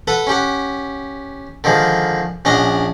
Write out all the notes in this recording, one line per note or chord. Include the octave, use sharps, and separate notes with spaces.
A4 B4 F#5
C#4 G4 F#5
D3 D#3 F3 G#3
A#1 C#4 D4 D#5 F#5